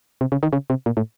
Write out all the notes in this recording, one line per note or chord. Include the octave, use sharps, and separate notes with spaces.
C3
C#3
D#3
C#3
C3
A#2
A2